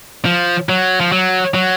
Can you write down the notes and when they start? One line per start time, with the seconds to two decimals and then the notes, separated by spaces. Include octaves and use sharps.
0.25 F3
0.69 F#3
1.01 F3
1.12 F#3
1.54 F#3